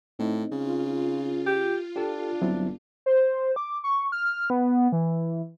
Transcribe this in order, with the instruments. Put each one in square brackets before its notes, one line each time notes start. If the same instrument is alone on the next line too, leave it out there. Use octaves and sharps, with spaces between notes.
[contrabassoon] A2 [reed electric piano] C4 D#4
[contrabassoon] C#3 [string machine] F4
[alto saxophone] G4
[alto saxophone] D4 [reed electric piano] G4 A4
[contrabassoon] G1 [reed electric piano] F#3 C4 E4
[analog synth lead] C5
D6
C#6
F6
B3
E3